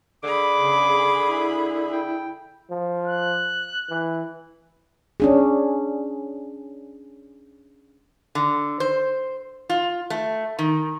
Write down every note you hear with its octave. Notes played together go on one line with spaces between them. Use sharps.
D3 G#4 B5 D6
C#3
E4
G5
F3
F#6
E3
C#4 D4 G#4
D3
C5
F4
A3
D#3